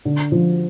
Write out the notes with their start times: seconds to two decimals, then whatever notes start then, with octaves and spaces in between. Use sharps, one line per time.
0.05 D3
0.32 F3